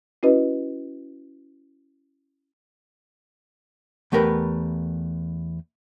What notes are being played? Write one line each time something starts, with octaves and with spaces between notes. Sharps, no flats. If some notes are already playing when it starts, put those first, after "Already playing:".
C#4 E4 F#4 B4 D#5
E2 A3 G4 A#4 B4